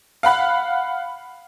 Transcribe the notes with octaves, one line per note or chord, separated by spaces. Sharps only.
F5 F#5 B5 F#6